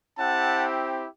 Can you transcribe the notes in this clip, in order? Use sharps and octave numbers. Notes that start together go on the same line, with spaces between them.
C4 E4 G4 F#5 A5